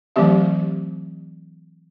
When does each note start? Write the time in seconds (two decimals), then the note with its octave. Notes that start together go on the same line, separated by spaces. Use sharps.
0.16 E3 F#3 A3 C4 G4 E5